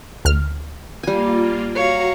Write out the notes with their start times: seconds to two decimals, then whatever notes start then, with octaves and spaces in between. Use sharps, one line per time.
0.25 D2 F6
1.03 G3 A#3 F4 G#5
1.75 F#4 C#5 F5 F#5 A#5